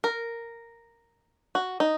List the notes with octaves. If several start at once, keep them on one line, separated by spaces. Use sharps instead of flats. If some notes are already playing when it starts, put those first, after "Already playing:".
A#4
F#4
D#4